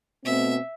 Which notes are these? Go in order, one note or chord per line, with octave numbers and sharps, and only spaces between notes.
B2 A3 C4 E5